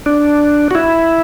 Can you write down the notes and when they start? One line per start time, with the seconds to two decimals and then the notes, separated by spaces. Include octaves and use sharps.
0.06 D4
0.71 F#4
0.75 E4